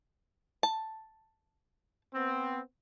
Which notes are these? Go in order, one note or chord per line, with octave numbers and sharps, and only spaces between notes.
A5
B3 C4